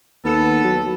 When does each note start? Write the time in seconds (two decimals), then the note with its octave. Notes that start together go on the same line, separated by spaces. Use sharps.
0.24 D#2 B3 A4
0.64 F#3